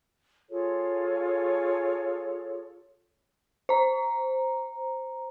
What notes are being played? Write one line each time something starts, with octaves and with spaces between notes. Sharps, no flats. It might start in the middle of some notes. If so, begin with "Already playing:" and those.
F4 G#4 A4 C#5
C5 A#5